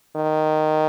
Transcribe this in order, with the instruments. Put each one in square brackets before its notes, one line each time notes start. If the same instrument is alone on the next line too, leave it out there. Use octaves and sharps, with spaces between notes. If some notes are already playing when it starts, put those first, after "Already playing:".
[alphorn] D#3